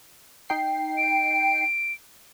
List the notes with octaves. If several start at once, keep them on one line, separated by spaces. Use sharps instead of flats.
D#4 G5 C7
D7